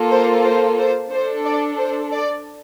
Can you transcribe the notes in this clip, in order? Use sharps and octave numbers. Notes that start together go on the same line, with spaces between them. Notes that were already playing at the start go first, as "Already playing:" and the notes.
Already playing: A#3 F4 A4
C5
C5
C5
D4 A4 C5
D5
C5
D5